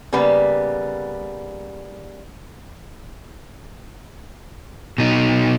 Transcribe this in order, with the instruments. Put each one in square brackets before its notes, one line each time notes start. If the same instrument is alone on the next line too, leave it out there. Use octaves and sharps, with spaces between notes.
[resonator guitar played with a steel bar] C#3 G3 A#3 B3 B4
[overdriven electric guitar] B2 D#4